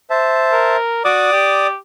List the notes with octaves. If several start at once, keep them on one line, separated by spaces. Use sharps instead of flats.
C5 E5 A5
A#4
F#4 D5 D6 D#6
G4